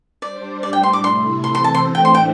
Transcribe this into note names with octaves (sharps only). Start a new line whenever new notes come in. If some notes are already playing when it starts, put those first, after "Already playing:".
G3 D4 C5 D5
A2 G3 D4 D5
G5
C6
D6
C3 A3 E4 C6
C3 E3 C4 A4 C5 C6
C6
A5
C6
A2 E3 A3 D4 C5
G5
C6
G5